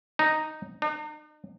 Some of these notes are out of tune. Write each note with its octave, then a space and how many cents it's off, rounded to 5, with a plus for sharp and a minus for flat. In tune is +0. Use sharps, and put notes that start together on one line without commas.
D#4 -5
D#4 -45